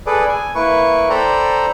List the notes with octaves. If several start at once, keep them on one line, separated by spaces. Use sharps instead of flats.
G#4 A4 B4 D5
G#5
A#3 E4 B4 C#6
A4 C5 D5 G5 A#5 B5